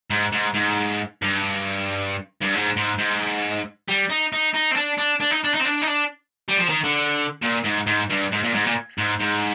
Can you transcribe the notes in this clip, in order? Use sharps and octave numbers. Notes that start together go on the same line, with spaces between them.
G#2
G#2
G#2
G2
G2
G#2
G#2
G#2
G3
D#4
D#4
D#4
C4
D4
D4
D4
D#4
D4
D#4
C4
D4
D#4
D4
G3
F3
D#3
D3
A#2
G#2
G#2
G2
G#2
A#2
G#2
A#2
G#2
G#2